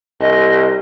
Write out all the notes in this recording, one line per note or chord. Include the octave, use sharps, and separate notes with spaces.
C2 D#5